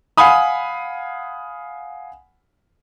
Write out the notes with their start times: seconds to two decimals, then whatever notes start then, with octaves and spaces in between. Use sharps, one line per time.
0.17 F5 F#5 G#5 B5 D#6